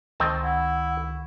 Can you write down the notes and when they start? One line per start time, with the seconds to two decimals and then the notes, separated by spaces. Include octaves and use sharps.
0.20 C#2 D#3 C4 D#4 A5 C#6
0.43 E4 F#5